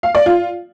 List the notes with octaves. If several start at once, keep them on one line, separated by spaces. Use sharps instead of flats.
F5
D5
F4